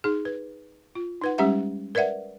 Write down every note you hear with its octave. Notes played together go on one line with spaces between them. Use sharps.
D#4 G#4
B4
F4
D#4 B4 F#5
G3 G#3 C#4 G4 E5 F#5
A#4 B4 D5 E5 F#5